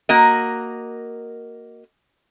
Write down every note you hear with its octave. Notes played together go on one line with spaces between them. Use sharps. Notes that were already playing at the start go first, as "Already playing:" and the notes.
A#3 F#4 A#4 D#5